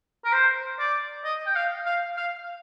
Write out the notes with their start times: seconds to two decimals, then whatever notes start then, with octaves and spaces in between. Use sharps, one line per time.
0.25 A#4
0.33 C5
0.79 D5
1.25 D#5
1.46 G5
1.56 F5
1.86 F5
2.17 F5